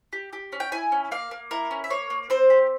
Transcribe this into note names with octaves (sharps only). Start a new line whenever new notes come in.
G4
G4
C#4
G5
E4 G#5
C#4
A#3 F5
A#3
E4 A#4
C#4
E5
A#3 C#5
A#3
C4 C5
G4